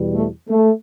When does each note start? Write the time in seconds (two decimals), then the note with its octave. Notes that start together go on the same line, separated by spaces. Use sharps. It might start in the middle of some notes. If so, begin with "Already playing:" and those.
Already playing: E2 B2 G3
0.13 A3
0.49 A3